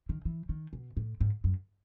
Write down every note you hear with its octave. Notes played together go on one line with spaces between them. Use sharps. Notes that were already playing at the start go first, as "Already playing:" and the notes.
D#3
E3
D#3
B2
A2
G#2
F#2